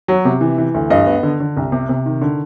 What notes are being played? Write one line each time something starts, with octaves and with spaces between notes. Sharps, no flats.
F#3
C3
E3
E3
D2
G2 D#5
B3
D3
D3
C2
C3
C3
D#3
D3